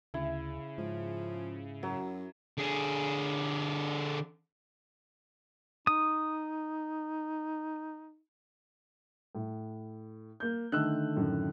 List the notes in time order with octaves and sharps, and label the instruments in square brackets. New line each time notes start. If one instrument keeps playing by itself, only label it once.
[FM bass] D2 [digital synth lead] C#3 [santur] E4
[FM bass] G#2 [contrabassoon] F3
[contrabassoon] F#2 [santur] F#3
[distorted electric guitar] D3 G#4
[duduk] D#4 [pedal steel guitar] D#6
[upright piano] A2
A#3 G6
[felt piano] D3 D#3 A3 [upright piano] E6 F#6
[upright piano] F#2 A2